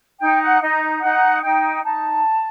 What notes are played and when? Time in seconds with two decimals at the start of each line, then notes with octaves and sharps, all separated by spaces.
0.20 D#4 G5
0.41 F#5
0.60 D#4 D#5
1.02 D#4 F#5
1.43 D#4 G5
1.83 D#4 A5